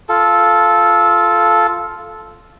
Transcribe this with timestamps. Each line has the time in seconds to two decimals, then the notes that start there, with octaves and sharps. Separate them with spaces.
0.09 F4 A4